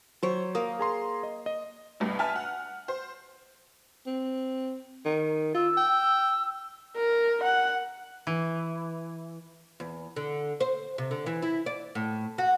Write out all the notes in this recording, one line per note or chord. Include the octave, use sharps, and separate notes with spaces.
F#3 C5 C#5
A#3 A#4 D#6
G#4 A#5 C6
D#5
D#5
G1 C2 G2
E5 G#5 A5 F6
F#5
C5
C4
D#3
F4 E6
G5
A#4
F#5
E3
E2
D3
C5
C3
D3
E3
E4
D5
A2
F#4